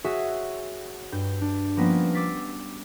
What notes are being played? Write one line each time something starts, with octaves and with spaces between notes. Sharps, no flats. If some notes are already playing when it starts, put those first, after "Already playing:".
F#4 G#4 C#5 E5 F#5 G#5
G2 G6
D4
F3 G3 A#3 B3 C#4
D6 E6 A6 B6 C7